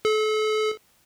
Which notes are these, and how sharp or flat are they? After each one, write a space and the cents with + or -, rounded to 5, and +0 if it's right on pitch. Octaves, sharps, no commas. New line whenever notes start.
A4 -35